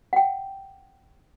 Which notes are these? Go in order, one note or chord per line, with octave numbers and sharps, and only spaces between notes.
F#5 G5